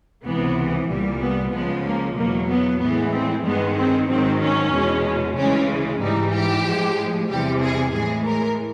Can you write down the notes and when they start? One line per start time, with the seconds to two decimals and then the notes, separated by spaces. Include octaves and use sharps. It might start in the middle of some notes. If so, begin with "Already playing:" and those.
0.25 C#2 C3 E3 B3
0.89 C2 A#2 G3
1.21 B3
1.53 C#2 C#3 F3 G#3 B3
1.85 A#3
2.17 E2 B2 F#3 A#3
2.49 B3
2.81 A2 E3 G#3 B3
3.13 C4
3.45 G2 D#3 G#3 B3
3.78 C4
4.09 G#2 D#3 F#3 C4
4.42 C#4
4.73 E2 B2 G#3
5.37 D2 C#3 E3 G#3 C#4
6.01 G#2 E3 G3 D#4
6.33 G4
6.65 A2 F3 G#3
7.29 E2 C3 E3 G3 G4
7.62 G#4
7.93 A2 E3 G#3 G#4
8.26 A#4